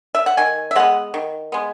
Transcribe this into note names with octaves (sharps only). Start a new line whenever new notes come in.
E5
F#5
D#3 G#5
E5
G#3 B3 F#5
D#3
G#3 B3